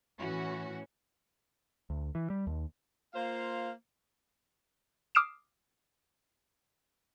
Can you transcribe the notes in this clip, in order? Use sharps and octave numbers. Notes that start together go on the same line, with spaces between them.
A2 E3 C#4 F#4
D2
E3
G3
D#2
A#3 F4 C5 F5
D6 D#6 F6 C7 D7 E7